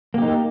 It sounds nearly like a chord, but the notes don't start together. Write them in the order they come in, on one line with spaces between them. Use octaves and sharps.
A#3 G4 D#4